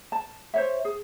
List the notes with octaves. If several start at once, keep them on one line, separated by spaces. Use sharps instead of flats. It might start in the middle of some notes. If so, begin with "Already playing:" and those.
A5
C5 C#5 E5
G#4